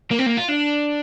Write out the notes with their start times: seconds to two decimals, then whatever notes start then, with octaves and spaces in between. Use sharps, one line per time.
0.11 A#3
0.19 C4
0.26 A#3
0.37 F4
0.48 D4